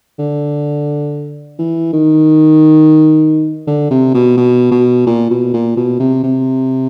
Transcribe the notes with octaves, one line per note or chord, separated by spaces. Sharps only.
D3
E3
D#3
D3
C3
B2
B2
B2
A#2
B2
A#2
B2
C3
C3